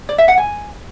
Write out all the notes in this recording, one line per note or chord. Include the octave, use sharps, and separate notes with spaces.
D5
E5
F#5
G#5